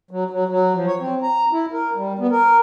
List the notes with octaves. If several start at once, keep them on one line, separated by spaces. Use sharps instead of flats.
F#3
F#3
F#3
F3
C#5
C4
A#5
E4
A#4
G3
B3
A#4